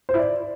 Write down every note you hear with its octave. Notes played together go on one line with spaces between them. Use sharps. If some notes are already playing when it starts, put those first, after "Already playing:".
C5
E4
D5